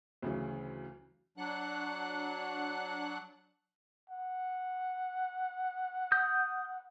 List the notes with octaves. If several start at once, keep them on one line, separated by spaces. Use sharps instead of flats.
D2 C#3 E3 F#3
F#3 D4 F#5 F#6
F#5
D#6 G6